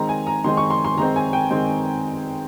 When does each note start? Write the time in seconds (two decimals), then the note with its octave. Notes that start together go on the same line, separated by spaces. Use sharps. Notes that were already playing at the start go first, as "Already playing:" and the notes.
Already playing: D#3 G#3 C4 A#5
0.09 G#5
0.27 A#5
0.44 D#3 G#3 C4 C6
0.57 C#6
0.70 C6
0.85 C6
0.97 D#3 G#3 C4 A#5
1.16 G#5
1.33 G5
1.51 D#3 G#3 C4